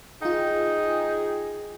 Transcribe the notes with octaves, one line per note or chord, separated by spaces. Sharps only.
D#4 F4 G#4 G5